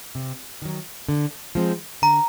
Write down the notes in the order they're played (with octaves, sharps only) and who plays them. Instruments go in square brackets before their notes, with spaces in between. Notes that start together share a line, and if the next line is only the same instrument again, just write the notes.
[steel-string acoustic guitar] C3
D#3 F#3
D3
F3 G#3 C4
[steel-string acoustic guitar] D3 [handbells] A#5